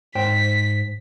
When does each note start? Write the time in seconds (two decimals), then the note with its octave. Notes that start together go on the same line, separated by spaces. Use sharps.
0.15 G#2 C5 G5 B6